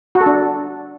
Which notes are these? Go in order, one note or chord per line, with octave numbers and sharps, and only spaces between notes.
F#4
A4
D4